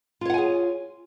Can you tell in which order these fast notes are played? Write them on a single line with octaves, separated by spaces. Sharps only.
F4 C#5 F#5 G#5 G#4